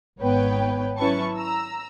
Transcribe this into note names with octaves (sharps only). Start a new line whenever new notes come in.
G#1 G#2 B3 B4 C#5 G5
F#3 C#4 E4 B4 A5 C#6
A#5 E6